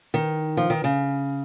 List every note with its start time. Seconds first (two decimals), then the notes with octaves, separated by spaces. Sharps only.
0.14 D#3
0.57 F3
0.70 D#3
0.84 C#3